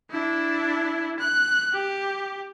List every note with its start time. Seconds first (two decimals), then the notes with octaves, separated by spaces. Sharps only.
0.10 D4 E4
1.19 F#6
1.73 G4